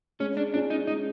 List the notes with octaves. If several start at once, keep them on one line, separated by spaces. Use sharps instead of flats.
G#3 C#4
D4
C#4 D4 F4 G#4
D#4
G#3 D#4